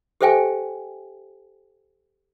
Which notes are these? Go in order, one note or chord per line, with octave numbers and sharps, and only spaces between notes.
G4 A4 C5 E5 G5 G#5